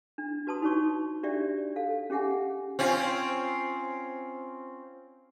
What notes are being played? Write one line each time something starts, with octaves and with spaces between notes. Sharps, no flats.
D4
F#4 B4 A5 C6 D#6
D#4 F#4 C#5 C#6
D4 F#4 G4 C#5 D5 E5
A4 F5
C#4 G4 G#4 E5 F#5 G#5
C4 C#4 F4